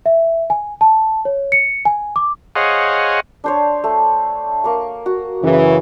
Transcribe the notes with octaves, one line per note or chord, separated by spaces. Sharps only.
E5
G#5
A5
C#5
C#7
G#5
D6
G#4 C5 C#5 D#5 F5 F#5
D4 C5 C#5
A3
A#3 C#6
F#4
F#2 C#3 E3